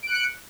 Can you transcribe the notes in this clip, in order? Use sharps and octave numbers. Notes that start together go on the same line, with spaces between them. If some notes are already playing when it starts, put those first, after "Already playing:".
F#6 C#7 D7